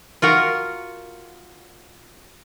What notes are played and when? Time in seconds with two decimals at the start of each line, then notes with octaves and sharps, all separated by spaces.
0.22 F4 F#4 A#4